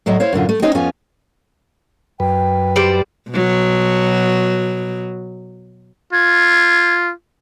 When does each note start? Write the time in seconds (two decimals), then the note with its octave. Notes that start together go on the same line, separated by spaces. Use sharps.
0.06 A2 F#3 A3 D#5 E5
0.20 E4 C5 C#5 F5
0.33 F#2 A2 D3 F4
0.49 A3
0.62 C4 C#4 D#4 C5 C#5 D#5
0.75 F2 B3 C#4 F4 G#5
2.20 F#2 B4 G5
2.76 G3 C5 D5
3.30 B2 F#3
6.13 F4 G#6